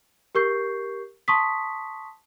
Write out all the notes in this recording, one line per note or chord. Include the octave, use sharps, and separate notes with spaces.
G4 A#4 C#6 G6 C7
A5 C6 C#6 D#6 B6